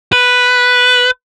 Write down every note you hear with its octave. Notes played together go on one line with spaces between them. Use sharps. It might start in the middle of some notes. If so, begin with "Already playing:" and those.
B4